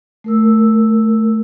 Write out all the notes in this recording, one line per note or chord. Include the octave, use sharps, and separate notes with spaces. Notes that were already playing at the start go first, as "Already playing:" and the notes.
A3 A#4 E6